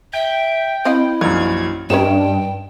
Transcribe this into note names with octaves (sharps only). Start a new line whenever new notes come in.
E5 G5
C4 E4 D#5 F5
A#1 F#2 D#4 G#6
G2 C#4 D#4 G5 E7